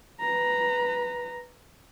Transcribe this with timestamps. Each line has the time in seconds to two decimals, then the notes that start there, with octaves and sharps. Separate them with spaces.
0.21 B4 A#5